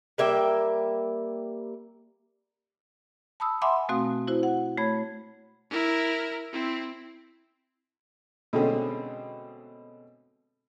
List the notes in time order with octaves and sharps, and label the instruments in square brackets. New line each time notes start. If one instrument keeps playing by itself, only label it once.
[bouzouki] G3 A#3 E5 G5
[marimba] A5 B5 D#6 E6
E5 F#5 G#5 B5 C6 D6
B2 A3 C4 F#4 F5 D#6
E4 F#4 C5
F#5
A3 C#5 B5 G#6
[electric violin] E4 A#4
C4 E4
[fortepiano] B2 D3 G#3 A3 C4 C#4